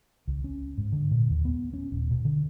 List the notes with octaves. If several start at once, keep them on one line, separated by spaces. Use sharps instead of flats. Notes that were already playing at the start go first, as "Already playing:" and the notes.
C#2
C#4
G#2
D3
A#2
D#2
B3
C#4
D#1
B2
D3